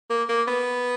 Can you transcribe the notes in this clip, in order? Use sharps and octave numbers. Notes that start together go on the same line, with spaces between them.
A#3
A#3
B3